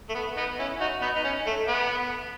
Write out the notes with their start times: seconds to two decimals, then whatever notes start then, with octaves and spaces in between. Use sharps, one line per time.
0.09 A3
0.15 B3
0.36 B3 D#4
0.59 C#4 E4
0.80 D#4 F#4
1.01 B3 D#4
1.15 D#4
1.24 C#4
1.46 A3
1.68 B3